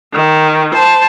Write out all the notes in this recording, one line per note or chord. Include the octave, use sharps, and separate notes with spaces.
D#3
C5 A5